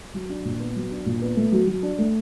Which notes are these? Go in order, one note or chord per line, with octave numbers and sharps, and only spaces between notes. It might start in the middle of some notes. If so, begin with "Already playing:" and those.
F#3
D4
A#2
B3
F#3
D4
A#2
B3
A3
F#3
F#3
D4
A3